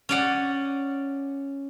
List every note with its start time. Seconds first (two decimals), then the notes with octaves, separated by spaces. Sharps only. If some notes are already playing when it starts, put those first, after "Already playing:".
0.09 C#4 D5 F#5